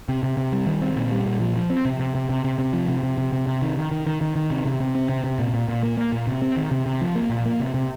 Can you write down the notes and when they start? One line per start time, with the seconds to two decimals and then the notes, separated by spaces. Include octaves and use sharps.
0.09 C3
0.23 C3
0.37 C3
0.52 G3
0.67 D#3
0.81 C4
0.96 A#2
1.12 G3
1.26 A#2
1.41 F3
1.56 F3
1.70 C4
1.85 C3
2.00 C3
2.15 C3
2.29 C3
2.44 C3
2.59 C3
2.73 F3
2.88 C3
3.03 C3
3.18 C3
3.33 C3
3.47 C3
3.62 D#3
3.77 D#3
3.91 D#3
4.07 D#3
4.21 D#3
4.36 D#3
4.50 C3
4.65 C3
4.80 C3
4.95 C4
5.09 C3
5.24 C3
5.39 A#2
5.53 A#2
5.68 A#2
5.83 A#3
5.97 A#3
6.12 A#2
6.27 C3
6.42 C4
6.56 D#3
6.71 C3
6.86 C3
7.01 F3
7.15 A#3
7.30 A#2
7.46 A#3
7.60 C3
7.74 C3